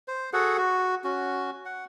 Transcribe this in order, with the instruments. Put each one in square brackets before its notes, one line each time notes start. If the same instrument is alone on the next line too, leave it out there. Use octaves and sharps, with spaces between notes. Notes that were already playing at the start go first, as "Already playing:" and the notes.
[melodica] C5
F#4 G#4 A4 F#5
F#4
C#4 F#4
F#5